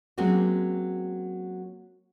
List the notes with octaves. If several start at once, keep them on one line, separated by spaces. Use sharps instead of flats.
F#3 G#3 A#3 C4 C#4 F#4